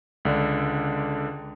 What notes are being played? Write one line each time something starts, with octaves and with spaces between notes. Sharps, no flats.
C#2 D3 D4